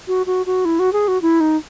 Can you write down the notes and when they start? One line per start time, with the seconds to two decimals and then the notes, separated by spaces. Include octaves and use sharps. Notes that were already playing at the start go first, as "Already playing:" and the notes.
0.08 F#4
0.26 F#4
0.46 F#4
0.65 E4
0.79 F#4
0.93 G#4
1.08 F#4
1.22 E4
1.40 D#4